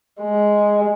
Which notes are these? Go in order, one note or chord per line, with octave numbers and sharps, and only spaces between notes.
G#3